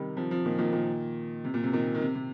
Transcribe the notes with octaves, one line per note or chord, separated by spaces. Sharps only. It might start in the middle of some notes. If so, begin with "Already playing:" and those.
Already playing: C3 D#3 G3
C3 F3
C3 F3
A#2 D#3
A#2 D#3
A#2 D#3
C3
A#2
C3
A#2 D#3
D#3
C3
C3